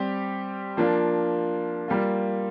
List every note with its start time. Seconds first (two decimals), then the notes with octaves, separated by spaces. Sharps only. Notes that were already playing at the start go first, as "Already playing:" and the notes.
Already playing: G3 C4 G4
0.77 F3 A#3 D4 F4
1.88 G3 A#3 F4